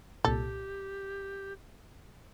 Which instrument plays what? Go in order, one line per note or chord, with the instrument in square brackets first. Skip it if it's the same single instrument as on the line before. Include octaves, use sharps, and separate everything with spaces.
[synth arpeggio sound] C2 A#2 [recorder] G4 [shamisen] A4